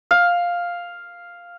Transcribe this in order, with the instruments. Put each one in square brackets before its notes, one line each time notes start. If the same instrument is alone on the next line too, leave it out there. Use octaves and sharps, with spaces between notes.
[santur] F5